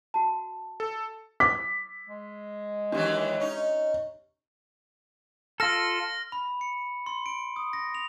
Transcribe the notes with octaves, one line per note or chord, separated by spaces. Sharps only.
F#4 A5
A4
D6 B6
G#3
D#2 E3 F#3 D4 G4
C#4 D#4
F4 A4 F6 A#6
B5
C#7
C6
D7
D#6
A#6
F7